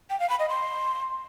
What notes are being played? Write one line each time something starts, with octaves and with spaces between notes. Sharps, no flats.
G5
F5
B5
D#5
C6